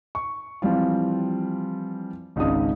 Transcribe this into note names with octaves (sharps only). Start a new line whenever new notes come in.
C#6
E3 F3 G3 C4 F4
G#1 C#2 C#3 D4 D#4 D#6